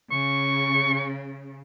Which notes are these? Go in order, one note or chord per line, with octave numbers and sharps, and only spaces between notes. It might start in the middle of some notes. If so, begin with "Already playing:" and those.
C#3 C#6